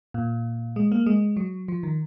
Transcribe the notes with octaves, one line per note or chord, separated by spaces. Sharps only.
A#2
G#3
A#3
G#3
F#3
F3
D#3